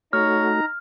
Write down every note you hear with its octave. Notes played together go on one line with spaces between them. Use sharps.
A3 D#4 F#4 C#5 A#5 F6